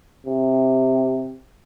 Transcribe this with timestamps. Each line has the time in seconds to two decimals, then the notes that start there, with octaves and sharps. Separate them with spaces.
0.26 C3